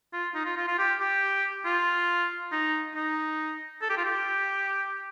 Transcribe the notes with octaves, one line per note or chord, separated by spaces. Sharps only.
F4
D#4
F4
F4
F4
G4
G4
F4
D#4
D#4
A4
G4
F4
G4